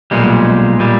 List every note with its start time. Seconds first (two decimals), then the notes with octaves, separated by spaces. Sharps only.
0.11 B1 A#2 G3 G#3
0.79 A#2 G3